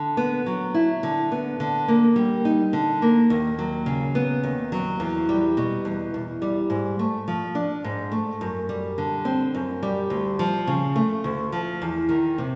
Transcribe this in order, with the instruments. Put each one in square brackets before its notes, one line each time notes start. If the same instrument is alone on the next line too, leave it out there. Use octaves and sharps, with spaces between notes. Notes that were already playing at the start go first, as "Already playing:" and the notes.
Already playing: [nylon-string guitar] D3
B3
F#3
E4
D3
B3
D3
A#3
G3
D#4
D3
A#3
D#2
F#3
C#3
B3
D#2
F#3
E2
G3
B2
E2
E2
G3
G#2
A3
F3
D4
G#2
A3
F#2
G3
D3
C4
F#2
G3
D2
F3
C#3
A3
D2
F3
E2
D#3
C3